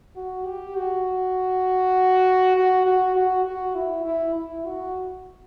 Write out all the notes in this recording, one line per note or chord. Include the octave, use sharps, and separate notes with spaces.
F#4
G4
F#4
F#4
F#4
F#4
F#4
E4
E4
E4
F#4